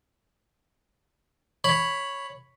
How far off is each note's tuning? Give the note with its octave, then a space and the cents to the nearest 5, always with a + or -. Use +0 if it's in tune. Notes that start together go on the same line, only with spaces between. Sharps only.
C#5 +0 B5 +0